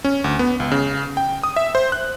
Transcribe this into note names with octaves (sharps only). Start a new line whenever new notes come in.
C#4
D2
B3
C#2
C#3
G5
D#6
E5
C5
F#6